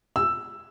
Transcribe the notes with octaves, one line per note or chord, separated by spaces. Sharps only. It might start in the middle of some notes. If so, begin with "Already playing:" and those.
E6